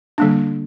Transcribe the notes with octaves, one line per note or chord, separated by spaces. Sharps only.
D3 G3 A#3 D4